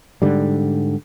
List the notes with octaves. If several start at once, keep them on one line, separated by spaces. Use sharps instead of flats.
G#2 D3 G3